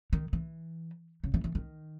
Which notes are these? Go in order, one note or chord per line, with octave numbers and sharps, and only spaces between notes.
D#3
E3
C#3
E3
E3
D#3